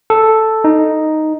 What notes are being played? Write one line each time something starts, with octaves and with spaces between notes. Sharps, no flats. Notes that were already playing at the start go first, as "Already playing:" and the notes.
A4
D#4